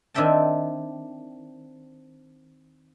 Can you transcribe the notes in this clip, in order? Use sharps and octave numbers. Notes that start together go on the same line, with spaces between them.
D#3 C4 D4 E5 G5 A5